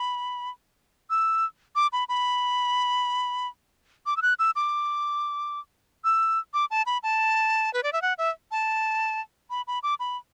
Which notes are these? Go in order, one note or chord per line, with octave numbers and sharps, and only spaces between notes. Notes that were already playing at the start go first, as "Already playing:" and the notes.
Already playing: B5
E6
D6
B5
B5
D6
E6
F#6
E6
D6
E6
D6
A5
B5
A5
B4
D5
E5
F#5
E5
A5
B5
B5
D6
B5